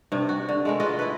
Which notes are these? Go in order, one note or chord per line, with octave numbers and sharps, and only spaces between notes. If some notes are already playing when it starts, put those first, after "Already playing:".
G2 C3
F#4
D3
G#3 A3 A#4
F4 F#4 B4 D#5
E4 B4